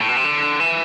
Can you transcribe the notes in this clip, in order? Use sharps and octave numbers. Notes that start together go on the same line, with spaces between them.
A2
B2
C3
D3
E3